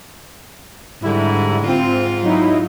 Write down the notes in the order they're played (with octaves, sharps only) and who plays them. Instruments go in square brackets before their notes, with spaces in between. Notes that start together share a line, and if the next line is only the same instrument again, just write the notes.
[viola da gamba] G#2 [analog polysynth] D3 G3 E4
[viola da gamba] G#2 F4 [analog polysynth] C4
[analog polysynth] F#3 D#4 E4